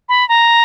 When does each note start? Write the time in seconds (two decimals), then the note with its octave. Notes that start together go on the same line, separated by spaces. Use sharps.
0.09 B5
0.29 A#5